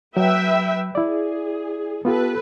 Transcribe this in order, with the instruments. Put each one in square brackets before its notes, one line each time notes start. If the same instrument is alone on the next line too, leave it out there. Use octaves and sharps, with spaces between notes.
[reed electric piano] F#3 [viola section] B4 E5 G5
[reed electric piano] E4 D5 [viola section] G#4
[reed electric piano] B3 F4 G4 [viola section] A4 B4